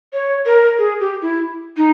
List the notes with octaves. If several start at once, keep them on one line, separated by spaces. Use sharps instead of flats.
C#5
A#4
G#4
G4
E4
D#4